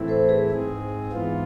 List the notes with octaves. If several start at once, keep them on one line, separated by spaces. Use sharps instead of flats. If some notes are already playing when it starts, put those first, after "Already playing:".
Already playing: A2 E3 A3 C4 E4
A4 C5
G#4 B4
G#2 G#3 C4 G#4
G#2 E3 B3 F4